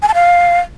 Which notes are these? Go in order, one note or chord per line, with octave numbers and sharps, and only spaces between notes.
G#5
A5
F5